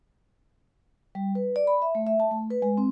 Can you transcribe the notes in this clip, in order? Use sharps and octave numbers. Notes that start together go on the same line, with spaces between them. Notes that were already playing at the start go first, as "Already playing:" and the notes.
G3
B4
D5
B5
E5
A3
E5
A5
A3
B4
G#3
C4